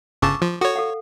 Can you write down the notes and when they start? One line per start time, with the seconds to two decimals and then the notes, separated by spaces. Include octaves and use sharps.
0.22 G1 C#3 A5 C#6 D6 E6
0.42 F3
0.61 F#4 A4 C#5
0.76 A4 F5 F#5